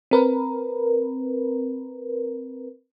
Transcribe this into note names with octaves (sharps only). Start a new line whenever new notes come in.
C4 A#4 B4